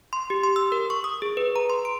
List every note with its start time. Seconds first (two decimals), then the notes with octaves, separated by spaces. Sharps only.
0.13 C6
0.30 G4
0.44 C6
0.56 E6
0.72 A#4
0.90 C#6
1.04 D#6
1.22 G#4
1.37 B4
1.56 A#5
1.70 C6
1.85 D7